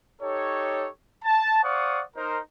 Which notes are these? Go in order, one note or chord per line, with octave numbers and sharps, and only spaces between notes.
D#4 G4 A4 C#5
A5
C5 D5 F5 F#5 C#6 D#6
D#4 A#4 C5